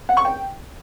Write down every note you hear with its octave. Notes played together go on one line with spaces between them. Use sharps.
F#5
C#6
G5